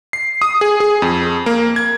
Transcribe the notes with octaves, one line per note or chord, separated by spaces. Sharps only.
C7
D#6
G#4
G#4
F2
A#3
G#6